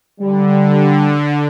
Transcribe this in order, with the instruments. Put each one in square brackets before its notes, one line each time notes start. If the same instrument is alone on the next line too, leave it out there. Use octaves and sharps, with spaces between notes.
[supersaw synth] D3 [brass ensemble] G3